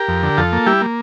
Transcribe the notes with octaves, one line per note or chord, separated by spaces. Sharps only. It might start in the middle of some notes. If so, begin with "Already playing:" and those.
Already playing: G4 A#4
F2
D3
F2 F4 A4
A#3
G3 E4 G4
A#3